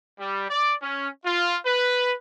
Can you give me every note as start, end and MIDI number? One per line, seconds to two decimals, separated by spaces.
0.19 0.44 55
0.49 0.73 74
0.81 1.08 61
1.25 1.57 65
1.65 2.13 71